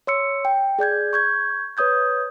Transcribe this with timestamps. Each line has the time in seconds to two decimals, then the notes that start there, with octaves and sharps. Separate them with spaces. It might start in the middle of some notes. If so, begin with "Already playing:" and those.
0.07 C#5 C6 E6 C#7
0.45 G5
0.79 G#4 D5 G6 G#6
1.13 C#6 G6 G#6
1.77 B4 C#5 D#6 G6 G#6